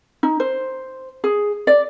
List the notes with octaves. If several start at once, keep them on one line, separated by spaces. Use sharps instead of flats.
D#4
C5
G#4
D5